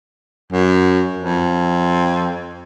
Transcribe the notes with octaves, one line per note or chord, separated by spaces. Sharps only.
F#2
F2